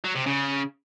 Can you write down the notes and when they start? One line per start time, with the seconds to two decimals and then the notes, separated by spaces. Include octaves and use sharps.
0.04 F#3
0.15 C3
0.26 C#3